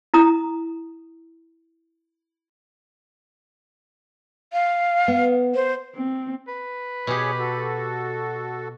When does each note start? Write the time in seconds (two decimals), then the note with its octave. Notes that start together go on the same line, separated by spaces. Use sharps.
0.14 E4 A#5 D#6
4.53 F5
5.08 B3
5.54 C5
5.96 C4
6.48 B4
7.07 B2 G4 G#4 C#5
7.39 F#4 A4